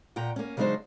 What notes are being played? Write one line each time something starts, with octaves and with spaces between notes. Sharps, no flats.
A#2 F#5 G5 A#5
A#3 C#4
C#3 F#3 G#3 D4 D#4 C5